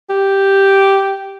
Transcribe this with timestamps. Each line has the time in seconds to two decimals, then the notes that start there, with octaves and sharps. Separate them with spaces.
0.10 G4